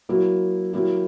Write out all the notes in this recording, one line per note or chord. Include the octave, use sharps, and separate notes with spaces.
F#3 A#3 E4
F#3 A#3 E4 G4